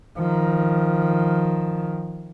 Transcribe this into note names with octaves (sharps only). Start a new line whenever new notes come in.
D#3 F3